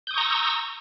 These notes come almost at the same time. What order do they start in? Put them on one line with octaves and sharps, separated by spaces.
G6 D#6 C#6 A#5 E6